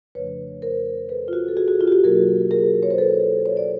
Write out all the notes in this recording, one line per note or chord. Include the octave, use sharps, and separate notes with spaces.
F2 C#3 F3 A3 D4 B4 C#5
A#4 C5
A4 B4
F4
F#4
A4
F#4 G#4
F#4
F4
G4
F#4
B2 F#3 A#3 D#4 G#4 A#4
G#4 A#4
C#5
C5
A4 B4
C#5
D5